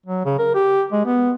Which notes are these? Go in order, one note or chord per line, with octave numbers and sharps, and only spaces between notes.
F#3
C#3
A#4
G4
G#3
B3